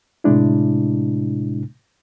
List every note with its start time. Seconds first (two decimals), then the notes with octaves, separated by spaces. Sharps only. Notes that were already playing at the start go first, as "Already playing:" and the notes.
0.24 A2 C3 G#3 D4 E4